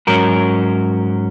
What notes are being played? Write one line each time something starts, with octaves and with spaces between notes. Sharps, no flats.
G#2 F#3 C#4 F#4 A#4